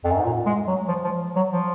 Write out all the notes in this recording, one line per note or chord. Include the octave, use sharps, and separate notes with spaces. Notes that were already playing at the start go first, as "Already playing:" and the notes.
F2
F#2
G#2
A#2
G#3
F#3
F3
F3
F#3
F3